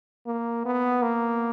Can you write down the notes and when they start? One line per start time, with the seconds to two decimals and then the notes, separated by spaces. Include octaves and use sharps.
0.27 A#3
0.66 B3
1.03 A#3